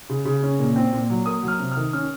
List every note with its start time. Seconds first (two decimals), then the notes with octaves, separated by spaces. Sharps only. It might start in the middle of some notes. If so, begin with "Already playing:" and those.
0.10 C#3
0.25 C#3
0.43 C#4
0.59 A#2
0.76 C4
0.93 A#2
1.10 F#3
1.26 A#3 D#6
1.43 F#3 F6
1.59 C3
1.72 F6
1.77 D#3
1.93 C#4 F6